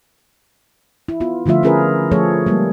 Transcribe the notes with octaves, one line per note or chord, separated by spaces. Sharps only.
E4
B3 F4
D3 F3 A3 F4 E5
C#4 F4 G#4 A#4 B4
F3 A3 G#4 A4 C#5
G3 G#3 A#3